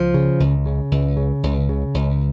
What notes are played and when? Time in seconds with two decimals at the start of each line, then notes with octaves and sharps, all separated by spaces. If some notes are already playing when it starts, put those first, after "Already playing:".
Already playing: C#2 F3
0.14 C#3
0.40 C#2
0.66 C#3
0.91 C#2
1.17 C#3
1.43 C#2
1.69 C#3
1.94 C#2